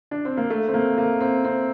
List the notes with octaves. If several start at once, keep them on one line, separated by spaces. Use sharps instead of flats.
D4
C4
A#3
A3
C4
A#3
A#3
C4
C4